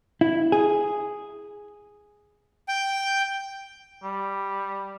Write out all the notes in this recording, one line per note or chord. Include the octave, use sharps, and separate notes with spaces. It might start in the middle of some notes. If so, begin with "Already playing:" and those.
E4
G#4
G5
G3